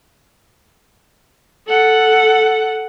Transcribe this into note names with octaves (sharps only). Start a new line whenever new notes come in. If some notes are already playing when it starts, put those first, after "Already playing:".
A4 F#5